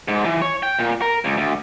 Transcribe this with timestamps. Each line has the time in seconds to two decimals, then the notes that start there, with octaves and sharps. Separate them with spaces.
0.08 G#2
0.26 E3
0.42 C#5
0.63 G5
0.79 A#2
1.02 A#4
1.25 C#2
1.37 D2